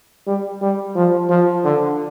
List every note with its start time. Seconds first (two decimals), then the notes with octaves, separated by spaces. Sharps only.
0.27 G3
0.62 G3
0.95 F3
1.30 F3
1.64 D3